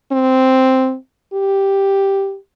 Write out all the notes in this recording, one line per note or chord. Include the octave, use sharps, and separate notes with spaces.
C4
G4